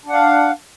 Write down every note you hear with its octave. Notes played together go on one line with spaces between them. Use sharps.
D4 F5 F#5